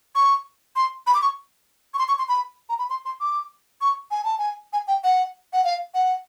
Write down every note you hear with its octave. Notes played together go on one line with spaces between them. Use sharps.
C#6
C6
B5
D6
C#6
C#6
C6
C#6
C6
B5
A#5
B5
C6
C6
D6
C#6
G#5
A5
G#5
G#5
G5
F#5
F#5
F5
F#5